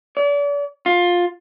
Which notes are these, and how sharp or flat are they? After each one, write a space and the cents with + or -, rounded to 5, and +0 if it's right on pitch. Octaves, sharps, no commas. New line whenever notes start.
D5 -40
F4 +15